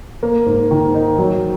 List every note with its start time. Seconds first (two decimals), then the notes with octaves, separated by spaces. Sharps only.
0.23 A#3
0.46 G#2
0.71 D#3
0.94 D#4
1.18 F#3